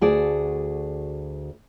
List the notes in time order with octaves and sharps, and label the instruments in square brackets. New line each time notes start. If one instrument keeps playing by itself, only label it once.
[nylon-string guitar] D2 F#4 G#4 A4 D5